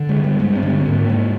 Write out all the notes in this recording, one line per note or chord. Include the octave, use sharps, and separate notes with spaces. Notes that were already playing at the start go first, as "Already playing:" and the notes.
Already playing: D3
G#3
G2
G3
G2 G#3
C4
D3
C4
C4
G#2 A#3
G#2